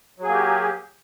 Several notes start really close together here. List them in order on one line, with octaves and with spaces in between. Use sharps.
F#3 G#4 A#3 G4